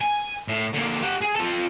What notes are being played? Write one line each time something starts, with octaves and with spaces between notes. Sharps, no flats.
G#5
A2
D3 A#3
G4 F#5
G#4
F4 A4